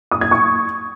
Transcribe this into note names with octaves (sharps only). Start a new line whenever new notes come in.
D#6
G#6
C#6